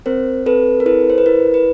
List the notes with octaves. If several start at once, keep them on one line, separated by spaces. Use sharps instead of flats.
C4 A#4 C5
C4 A4 B4
A#4
E4 A4 B4
C5
B4
E4 A#4
B4